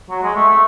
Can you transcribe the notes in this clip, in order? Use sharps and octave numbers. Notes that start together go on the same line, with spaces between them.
F#3
G#3
A3
A3